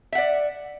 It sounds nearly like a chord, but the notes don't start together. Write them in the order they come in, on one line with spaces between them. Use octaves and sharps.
E5 F#5 D5